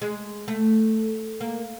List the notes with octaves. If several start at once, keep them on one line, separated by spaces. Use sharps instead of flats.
G#3
A3
A#3